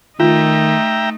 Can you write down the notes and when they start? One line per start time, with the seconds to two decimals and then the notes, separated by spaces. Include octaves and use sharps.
0.20 D#3 A3 D#4 F4 E5 G5 A#5